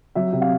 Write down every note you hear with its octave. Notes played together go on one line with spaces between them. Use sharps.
F#3 E5
C3
F5